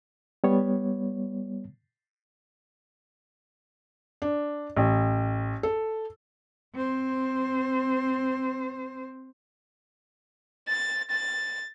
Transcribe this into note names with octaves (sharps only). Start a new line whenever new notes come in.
G3 B3 C#5
D4
A1
A4
C4 C5
A6
A6